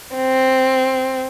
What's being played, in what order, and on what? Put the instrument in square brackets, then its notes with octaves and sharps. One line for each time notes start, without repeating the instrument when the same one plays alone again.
[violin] C4